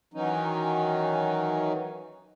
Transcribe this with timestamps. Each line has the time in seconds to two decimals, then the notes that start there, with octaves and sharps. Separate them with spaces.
0.14 D#3 E3 F#3 C#4 D#4